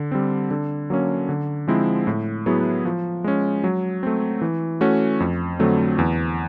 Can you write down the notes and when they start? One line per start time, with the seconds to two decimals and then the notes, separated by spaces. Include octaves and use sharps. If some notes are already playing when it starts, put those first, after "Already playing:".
Already playing: D3
0.12 G3 C4
0.51 D3
0.90 F#3 A#3 C#4
1.29 D3
1.68 F3 G#3 C4 E4
2.07 A2
2.46 F#3 B3 E4 G#4
2.85 F3
3.24 G#3 C#4
3.64 F#3
4.03 A3 C4
4.42 E3
4.81 A3 C#4 F#4
5.20 F2
5.59 D3 F#3 A3 C4
5.99 E2